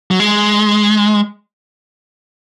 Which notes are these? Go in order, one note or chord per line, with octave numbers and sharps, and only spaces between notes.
F#3
G#3